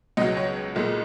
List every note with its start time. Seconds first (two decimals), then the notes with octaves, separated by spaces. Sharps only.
0.17 C#2 B2 F#3 D#5
0.37 C#5
0.75 B1 A#2 G#3